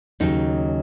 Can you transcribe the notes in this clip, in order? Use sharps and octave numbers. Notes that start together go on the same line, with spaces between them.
D#2 C#3 F#3 D#4